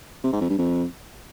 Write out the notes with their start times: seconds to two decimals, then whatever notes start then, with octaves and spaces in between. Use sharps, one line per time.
0.24 C3
0.33 G#2
0.41 F2
0.50 G2
0.58 F2